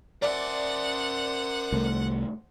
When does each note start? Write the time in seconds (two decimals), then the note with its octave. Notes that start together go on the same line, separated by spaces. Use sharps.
0.22 A#4 C5 D5 E5 F#5
1.72 C2 A3